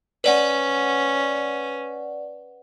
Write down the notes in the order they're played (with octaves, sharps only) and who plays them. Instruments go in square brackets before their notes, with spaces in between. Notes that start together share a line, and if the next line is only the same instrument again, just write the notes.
[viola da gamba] C#4 [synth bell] B4 D5 F#5